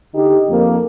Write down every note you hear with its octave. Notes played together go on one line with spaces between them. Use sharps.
D3 D#4 G4
F2 A#3